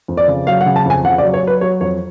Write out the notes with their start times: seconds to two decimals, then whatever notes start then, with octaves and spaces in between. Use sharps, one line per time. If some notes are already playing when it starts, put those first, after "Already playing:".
0.08 F2
0.17 D5
0.28 C#3
0.47 F#3 F5
0.61 F#5
0.66 C#3
0.76 A5
0.85 F2 G#5
1.04 C#3 F#5
1.18 D5
1.23 F#3
1.34 C#5
1.43 F#3 B4
1.61 F#3 C#5
1.81 F2 C#5